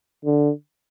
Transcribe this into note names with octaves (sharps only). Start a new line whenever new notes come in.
D3